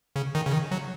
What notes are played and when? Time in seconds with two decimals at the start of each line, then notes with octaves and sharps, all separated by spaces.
0.16 C#3
0.35 D#3
0.46 C#3
0.52 D#3
0.71 F#3